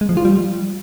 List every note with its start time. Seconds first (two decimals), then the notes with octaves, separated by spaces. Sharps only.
0.01 G#3
0.09 F3
0.17 F4
0.25 G3